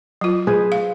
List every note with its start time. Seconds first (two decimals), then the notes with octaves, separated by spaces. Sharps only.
0.21 F#3 F4
0.47 G#4 B4 C5
0.72 F5